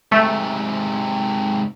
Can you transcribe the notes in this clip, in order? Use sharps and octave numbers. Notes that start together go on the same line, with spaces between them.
G#2 C3 A3